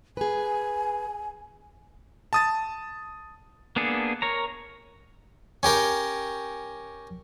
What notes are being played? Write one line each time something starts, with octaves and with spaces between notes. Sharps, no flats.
G#4 B4 G#5
A5 D#6 A6
A#3 B3 D4 G#4 A4
A#4 C#5 A#5
C#4 G4 A#4 G5